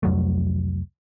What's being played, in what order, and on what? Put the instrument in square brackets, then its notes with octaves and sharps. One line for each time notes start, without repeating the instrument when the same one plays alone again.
[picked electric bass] C2 F2 F#3 A3